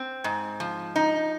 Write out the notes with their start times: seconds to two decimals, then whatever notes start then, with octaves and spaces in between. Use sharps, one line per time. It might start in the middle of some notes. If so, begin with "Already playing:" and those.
Already playing: C4
0.24 G#2
0.60 F3
0.96 D#4